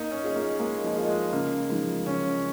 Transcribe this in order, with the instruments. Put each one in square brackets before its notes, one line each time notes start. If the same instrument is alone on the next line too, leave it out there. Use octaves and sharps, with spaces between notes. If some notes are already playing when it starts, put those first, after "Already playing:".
Already playing: [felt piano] A#3 [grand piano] D#4
[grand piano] C#4
[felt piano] F4 G#4 D#5
[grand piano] A#3
[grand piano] G#3 [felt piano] A#3
[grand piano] F3
[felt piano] F4 G#4 D#5
[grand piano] G#3
[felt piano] C#3 [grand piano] A#3
[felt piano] F3 G#3 D#4
[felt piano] C#3 [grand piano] C#4